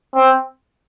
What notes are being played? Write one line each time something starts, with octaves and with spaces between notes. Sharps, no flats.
C4